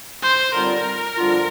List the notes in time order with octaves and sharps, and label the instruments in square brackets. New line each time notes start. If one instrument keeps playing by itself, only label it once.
[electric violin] C5
[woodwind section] D#2 D3 G3 C4 F4 [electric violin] A#4
[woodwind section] F2 D3 G3 D4 F4